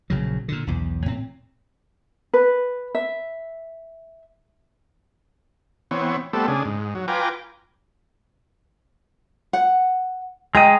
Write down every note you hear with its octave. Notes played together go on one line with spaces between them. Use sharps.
A#1 C#3 F#3
A#2 D3
B1 E2
A2 C4
B4
E5
E3 B3 C4 C#5
G3 A3 B3 C4 A4
C#3 D4 G#4
G#2
F#3
F4 B4 G5 G#5 A#5 D6
F#5
G#3 D#5 G5 A#5